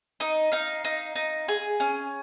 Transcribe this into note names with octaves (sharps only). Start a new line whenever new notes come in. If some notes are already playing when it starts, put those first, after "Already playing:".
D#4 D#5
D#4 F5
D#4
D#4
G#4
C#4